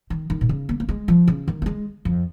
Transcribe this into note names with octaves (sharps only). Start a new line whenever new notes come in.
D#3
D#3
A#2
C#3
A#3
A#3
G#3
F3
C#3
D#3
A#3
G#3
F2